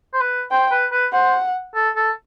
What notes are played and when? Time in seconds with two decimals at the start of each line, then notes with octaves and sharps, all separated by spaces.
0.13 C5
0.20 B4
0.51 C5 G5
0.71 B4
0.92 B4
1.13 C5 F#5
1.75 A4
1.96 A4